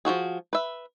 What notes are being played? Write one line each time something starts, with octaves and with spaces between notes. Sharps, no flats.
F3 G#3 F#4 G#4
B4 E5